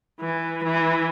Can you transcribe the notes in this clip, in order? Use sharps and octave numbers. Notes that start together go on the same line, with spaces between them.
E3
E3